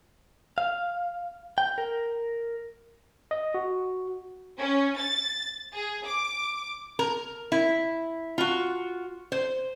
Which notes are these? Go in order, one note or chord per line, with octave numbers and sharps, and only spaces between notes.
F5
G5
A#4
D#5
F#4
C#4
A6
G#4
D6
A#4
E4
F4 F#4
C5